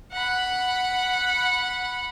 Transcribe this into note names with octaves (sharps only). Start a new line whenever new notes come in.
F#5 B5